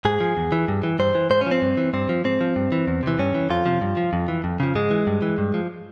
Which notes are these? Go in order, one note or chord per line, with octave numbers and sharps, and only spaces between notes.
G#2 G#4
F3
E2
E3
G2
E3
G2 C5
E3
G#2 C5
C#4
F3 C4
G2
E3
G2 C4
F3
G#2 C4
F3
G2
E3
E2
C3 E3
G2 C#4
E3
F2 F4
C3 F3
G2
F3
F2
E3
F2
C#3 F3
G#2 G#3
E3
G2
E3
G2
F3